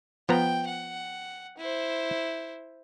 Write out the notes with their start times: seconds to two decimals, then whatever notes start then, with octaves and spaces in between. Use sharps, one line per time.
0.29 F3 B3 G5 A#5
0.67 F#5
1.58 E4 C5